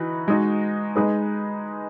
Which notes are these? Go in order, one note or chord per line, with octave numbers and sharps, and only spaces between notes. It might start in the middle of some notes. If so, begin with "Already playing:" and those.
Already playing: E3 D#4 F#4 B4
G#3 D#4 F#4
G#3 D#4 G#4 B4